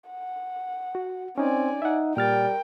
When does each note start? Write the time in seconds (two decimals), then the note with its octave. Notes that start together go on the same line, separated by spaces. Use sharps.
0.10 F#5
0.95 F#4
1.38 C4 C#4 D#4 D5 G#5
1.82 D#4 E5 F#5
2.17 A#2 G3 A#4 G5 F6 A6